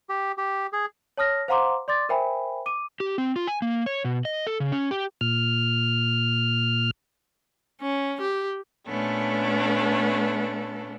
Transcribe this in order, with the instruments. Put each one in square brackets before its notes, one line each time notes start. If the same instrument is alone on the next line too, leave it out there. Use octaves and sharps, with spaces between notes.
[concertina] G4
G4
G#4
[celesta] C#5 A5 D#6 F6 A#6
C5 F5 F#5 A#5 C6 D6
D5 C6 D6 A6
A#4 C5 E5 G5 G#5 B5
D6 D#7
[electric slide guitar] G4
C4
F4
G#5
A#3
C#5
B2
D#5
A4
C#3
C#4
G4
[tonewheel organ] A#2 F6
[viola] C#4
G4
[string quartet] A#2 A3 B3 C#4 D4 A4